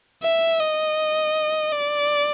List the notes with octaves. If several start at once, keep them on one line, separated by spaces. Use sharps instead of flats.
E5
D#5
D5